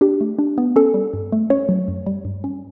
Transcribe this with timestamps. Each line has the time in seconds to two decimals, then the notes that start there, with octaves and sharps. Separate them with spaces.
0.01 D4 G4
0.21 A3
0.39 D4
0.58 B3
0.76 C#4 A4
0.94 G3
1.13 G2
1.32 A3
1.50 C#4 C#5
1.69 F#3
1.88 F#2
2.06 G3
2.25 G2
2.44 C#4